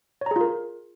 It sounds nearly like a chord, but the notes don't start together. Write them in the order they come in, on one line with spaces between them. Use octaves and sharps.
C#5 A#5 G#4 F4 A#4